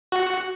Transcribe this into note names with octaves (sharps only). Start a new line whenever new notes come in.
F#4